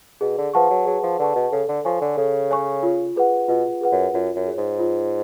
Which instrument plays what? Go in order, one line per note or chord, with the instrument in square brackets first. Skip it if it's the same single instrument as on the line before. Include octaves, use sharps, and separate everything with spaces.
[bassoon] B2 [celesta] G#4
[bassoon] D3
[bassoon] F3 [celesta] B4 F#5 A5 C#6
[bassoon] F#3
[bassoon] F#3 [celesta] G#4
[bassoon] F3
[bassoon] D3 [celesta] B4 F#5 A5 C#6
[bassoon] B2
[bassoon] C#3 [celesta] A4
[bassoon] D3
[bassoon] F3 [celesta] C#5 G#5 C#6
[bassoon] D3
[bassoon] C#3 [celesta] A4
[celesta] C#5 G#5 C#6
F4
G#4 B4 F#5
[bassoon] B2 [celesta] F4
[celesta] G#4 B4 F#5
[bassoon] F#2
[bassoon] F#2 [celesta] F4
[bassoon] F#2
[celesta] G#4 C#5
[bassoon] G#2
[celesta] F4